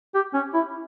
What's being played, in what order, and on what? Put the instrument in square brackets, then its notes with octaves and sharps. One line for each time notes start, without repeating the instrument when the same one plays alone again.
[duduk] G4
C#4
E4